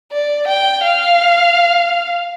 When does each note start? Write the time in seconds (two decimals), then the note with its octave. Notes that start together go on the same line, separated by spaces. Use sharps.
0.12 D5
0.48 G5
0.83 F5